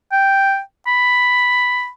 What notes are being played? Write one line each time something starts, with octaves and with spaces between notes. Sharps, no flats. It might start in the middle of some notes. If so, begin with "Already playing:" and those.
G5
B5